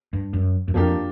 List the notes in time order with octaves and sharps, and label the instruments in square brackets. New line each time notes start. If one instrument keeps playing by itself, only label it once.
[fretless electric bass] G2
F#2
F#2
[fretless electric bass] F2 [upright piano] F3 A#3 D4 G4